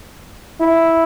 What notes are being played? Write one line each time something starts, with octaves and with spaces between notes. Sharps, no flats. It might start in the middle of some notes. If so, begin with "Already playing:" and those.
E4